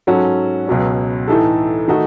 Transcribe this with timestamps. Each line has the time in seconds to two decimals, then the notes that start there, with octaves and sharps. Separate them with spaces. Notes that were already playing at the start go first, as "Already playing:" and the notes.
0.07 G#2 F#3 C#4 F#4 A4
0.67 C#2 B2 F#3 C#4
1.28 A2 E3 A3 D#4 A4
1.88 D#3 A3 D#4 F#4